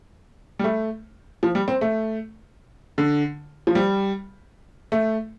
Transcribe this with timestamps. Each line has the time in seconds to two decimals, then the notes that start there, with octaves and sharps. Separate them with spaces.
0.59 G3
0.64 A3
1.43 F3
1.55 G3
1.68 C4
1.81 A3
2.98 D3
3.67 F3
3.75 G3
4.92 A3